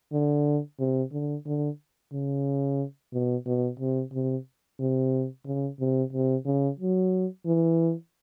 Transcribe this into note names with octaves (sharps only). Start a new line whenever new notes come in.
D3
C3
D3
D3
C#3
B2
B2
C3
C3
C3
C#3
C3
C3
C#3
F#3
E3